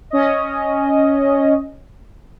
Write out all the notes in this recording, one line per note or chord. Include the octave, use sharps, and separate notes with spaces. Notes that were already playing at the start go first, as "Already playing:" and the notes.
C#4 D#5